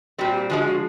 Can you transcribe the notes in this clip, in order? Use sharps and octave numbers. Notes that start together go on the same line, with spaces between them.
A#2 G3 C4 F#4
G4
D3 F3 G#3 F#4
G4
F#4